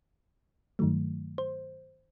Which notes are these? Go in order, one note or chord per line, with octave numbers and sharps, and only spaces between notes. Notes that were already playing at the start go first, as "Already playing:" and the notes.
G2 D#3 F#3 A3
C5